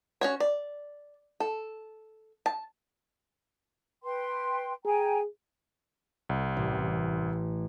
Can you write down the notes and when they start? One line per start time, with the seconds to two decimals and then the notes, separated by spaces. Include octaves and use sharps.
0.21 C#4 F#4 C#5
0.40 D5
1.40 A4
2.46 A5
4.04 B4 G5 C6
4.85 G#4 G5 G#5 A#5
6.29 C2
6.57 A1